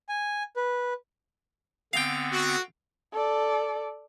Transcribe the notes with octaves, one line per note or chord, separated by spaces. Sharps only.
G#5
B4
D3 B3 C4 F5 G5
F#4
A4 D5